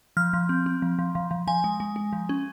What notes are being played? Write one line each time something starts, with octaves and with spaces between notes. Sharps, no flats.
F3 F6
F3
C4
C4
F3
F3
F3
F3
F3 G#5
G#3
G#3
G#3
F3
C#4